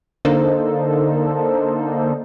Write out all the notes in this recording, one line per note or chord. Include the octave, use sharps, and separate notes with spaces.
D3 A#3 D4 D#4 A4 C5